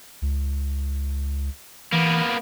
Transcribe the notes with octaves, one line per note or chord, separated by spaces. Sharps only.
C#2
E3 A#3 B3